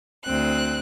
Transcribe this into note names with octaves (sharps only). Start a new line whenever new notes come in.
D2 C4 F#6